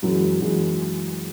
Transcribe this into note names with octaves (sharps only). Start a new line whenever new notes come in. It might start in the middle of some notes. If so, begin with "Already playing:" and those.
F#2 E3 G#3
F#2 E3 G#3